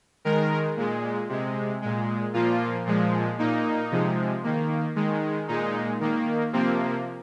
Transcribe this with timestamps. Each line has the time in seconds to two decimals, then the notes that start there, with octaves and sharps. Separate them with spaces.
0.25 D#3 G#3 A#4
0.77 A#2 G#3
1.29 C3 G#3
1.82 A#2 G#3
2.34 A#2 F3 A#3 F4
2.86 A#2 F3 G#3
3.38 A#2 A#3 D#4
3.91 C3 F3 G#3
4.43 D#3 A#3
4.96 D#3 G#3
5.48 A#2 G#3 D#4
6.00 D#3 A#3
6.53 C3 F3 A#3 C4